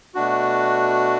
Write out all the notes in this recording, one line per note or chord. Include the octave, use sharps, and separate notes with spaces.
B2 A3 D4 F#4